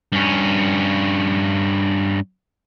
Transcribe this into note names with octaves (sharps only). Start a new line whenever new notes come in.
G2 C#4